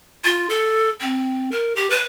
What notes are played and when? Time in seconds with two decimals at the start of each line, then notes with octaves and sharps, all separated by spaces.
0.24 F4
0.50 A4
1.01 C4
1.52 A#4
1.76 G4
1.90 B4